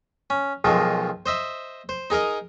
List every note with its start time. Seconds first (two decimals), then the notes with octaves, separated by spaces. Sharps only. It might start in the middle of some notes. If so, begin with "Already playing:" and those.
0.30 C#4
0.64 B1 D#3 F3 G#3
1.26 C5 D#5 E5
1.89 C5
2.10 D#4 G#4 A#4 D#5